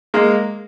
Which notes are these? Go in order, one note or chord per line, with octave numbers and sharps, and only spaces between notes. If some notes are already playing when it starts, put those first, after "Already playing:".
G#3 A#3